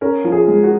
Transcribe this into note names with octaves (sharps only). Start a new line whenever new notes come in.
C#4 A#4
F3
G#4
G#3
F#4